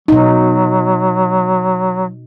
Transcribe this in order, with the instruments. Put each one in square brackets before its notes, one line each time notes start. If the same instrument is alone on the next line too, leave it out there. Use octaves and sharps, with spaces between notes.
[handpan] B2 D#4 [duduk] F#3